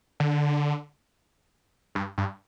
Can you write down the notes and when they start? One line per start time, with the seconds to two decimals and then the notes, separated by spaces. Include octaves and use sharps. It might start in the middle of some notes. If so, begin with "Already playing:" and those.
0.20 D3
1.95 G2
2.18 G2